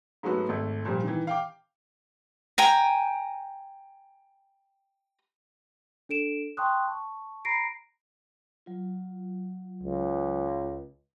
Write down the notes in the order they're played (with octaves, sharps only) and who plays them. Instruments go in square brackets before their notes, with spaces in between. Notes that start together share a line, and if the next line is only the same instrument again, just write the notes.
[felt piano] G#2 F#3 A3 B3 F#4
G#1 A3
A#2 F3 G3
D#3 E3
F5 G5 D6
[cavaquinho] G5 G#5 A#5
[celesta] D4 A4 D7 E7
G5 A5 C6 C#6 D#6 F#6
A5 C#6
A#5 B5 A#6 C7 D7
[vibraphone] F#3 F4
[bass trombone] C#2